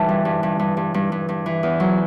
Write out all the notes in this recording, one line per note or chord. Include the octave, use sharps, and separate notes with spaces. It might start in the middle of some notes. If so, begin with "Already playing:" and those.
Already playing: E3 G3 A5
G2
G2
G2
G2
G2
G2
G2
G2
E3
E2
F#3